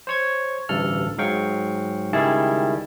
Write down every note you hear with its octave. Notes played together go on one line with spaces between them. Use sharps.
C5 C#5 G#6
A1 D2 G2 A4 F6
G#2 F#3 F5 G5 C#6
C#2 D#3 G3 E4 G#4 A5